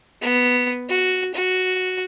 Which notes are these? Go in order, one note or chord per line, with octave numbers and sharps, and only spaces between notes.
B3
F#4
F#4